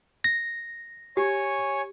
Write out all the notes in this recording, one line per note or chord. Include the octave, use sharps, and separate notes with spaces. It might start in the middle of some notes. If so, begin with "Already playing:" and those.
A#6
G4 C#5 G#5 C#6